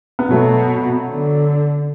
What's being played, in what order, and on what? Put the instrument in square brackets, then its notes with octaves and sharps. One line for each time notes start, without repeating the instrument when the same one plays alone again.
[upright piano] B3
[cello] B2 [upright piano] F#3 A3
[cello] D3